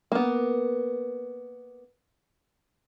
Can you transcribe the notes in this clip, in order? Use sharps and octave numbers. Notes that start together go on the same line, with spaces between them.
A#3 B3